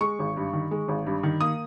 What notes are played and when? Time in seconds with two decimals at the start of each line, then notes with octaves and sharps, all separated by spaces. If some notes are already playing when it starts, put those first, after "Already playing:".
0.01 G#3 C#6
0.19 G#1
0.37 G2
0.53 D#3
0.71 G#3
0.88 G#1
1.06 G2
1.23 D#3
1.41 A#3 D#6